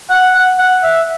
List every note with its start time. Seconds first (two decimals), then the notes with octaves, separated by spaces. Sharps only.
0.10 F#5
0.35 F#5
0.59 F#5
0.83 E5